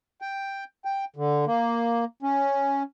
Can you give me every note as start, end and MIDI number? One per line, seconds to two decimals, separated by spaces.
0.22 0.64 79
0.85 1.05 79
1.16 1.45 50
1.46 2.05 58
2.22 2.83 61